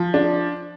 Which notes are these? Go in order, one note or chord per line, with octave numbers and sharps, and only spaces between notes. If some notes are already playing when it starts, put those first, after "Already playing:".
Already playing: F3
D4